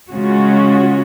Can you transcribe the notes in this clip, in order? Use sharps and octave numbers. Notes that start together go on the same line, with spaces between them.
C#3 G#3 C#4 F4 F#4